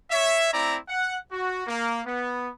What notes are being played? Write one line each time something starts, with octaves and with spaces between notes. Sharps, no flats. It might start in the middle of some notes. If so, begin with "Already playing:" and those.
C#5 E5
A3 C4 E4 D5 A#5
F#5
F#4
A#3
B3